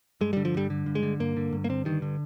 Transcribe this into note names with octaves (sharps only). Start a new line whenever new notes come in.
G2 G#3
D3 G3
F3
G2 G3
D3
G2
G#3
D3
G2 A#3
D3
G2
A#3
D3 C4
G2 D#3
D3